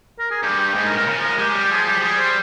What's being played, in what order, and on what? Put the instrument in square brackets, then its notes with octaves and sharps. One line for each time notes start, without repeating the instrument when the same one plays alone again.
[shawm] A#4
G#4
[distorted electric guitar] G2 [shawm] G4
[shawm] G4
[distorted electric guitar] G#2 [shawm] G#4
[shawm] A#4
[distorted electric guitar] A#2
[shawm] A#4
[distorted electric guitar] C#3
F3
[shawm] A#4
[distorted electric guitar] G#3
[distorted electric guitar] G#3 [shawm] G4
[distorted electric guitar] G3
[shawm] G4
[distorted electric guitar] F3 [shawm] G#4
[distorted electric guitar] G3 [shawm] G4
[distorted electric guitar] F3
[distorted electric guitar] G3 [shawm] G#4
[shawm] C5